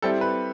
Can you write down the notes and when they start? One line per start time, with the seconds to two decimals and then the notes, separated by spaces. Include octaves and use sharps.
0.02 G3 C4 E4 G4 A4
0.21 B4